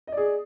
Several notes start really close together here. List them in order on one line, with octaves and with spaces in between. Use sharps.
D#5 D5 G#4